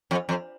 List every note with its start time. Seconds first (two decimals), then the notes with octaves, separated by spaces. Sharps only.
0.11 F2
0.29 F2